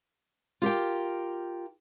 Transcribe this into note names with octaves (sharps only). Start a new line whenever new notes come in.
F4 G4 A#4 G5